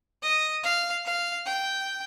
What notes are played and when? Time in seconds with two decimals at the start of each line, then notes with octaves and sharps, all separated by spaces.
0.23 D#5
0.64 F5
1.05 F5
1.46 G5